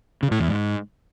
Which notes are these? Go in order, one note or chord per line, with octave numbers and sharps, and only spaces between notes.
C#3
A2
E2
G#2